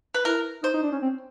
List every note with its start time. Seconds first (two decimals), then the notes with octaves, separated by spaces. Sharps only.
0.14 B4
0.25 E4 A#4
0.63 D#4 C5
0.73 D#4
0.83 D4
0.92 C#4
1.02 C4